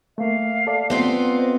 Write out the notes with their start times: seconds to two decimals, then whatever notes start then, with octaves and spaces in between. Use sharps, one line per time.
0.18 A3 A#3 E5 F5
0.67 A4 D5
0.90 B3 C4 F4
1.37 C5 D#5